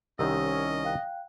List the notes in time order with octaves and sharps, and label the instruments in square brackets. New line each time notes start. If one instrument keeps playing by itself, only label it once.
[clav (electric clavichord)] C2 D#3 C4 [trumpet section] C#4 [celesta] G4 E6 [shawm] D#5
[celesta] F5 G5 F#6